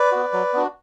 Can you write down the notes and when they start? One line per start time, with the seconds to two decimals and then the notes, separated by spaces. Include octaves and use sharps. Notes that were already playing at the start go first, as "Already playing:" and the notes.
Already playing: B4 D5
0.12 B3 F#4
0.33 F#3
0.53 B3 D4 F#4